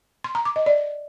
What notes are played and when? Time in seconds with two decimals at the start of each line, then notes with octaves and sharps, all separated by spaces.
0.24 C6
0.35 A#5
0.45 D6
0.56 D#5
0.66 D5